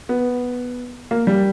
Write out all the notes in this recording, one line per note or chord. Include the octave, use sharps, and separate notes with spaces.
B3
A#3
G3